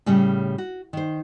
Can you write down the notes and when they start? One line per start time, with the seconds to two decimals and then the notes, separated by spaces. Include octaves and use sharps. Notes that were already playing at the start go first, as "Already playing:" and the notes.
0.06 A2 C#3 G3 C#4
0.58 F#4
0.93 D#3 C5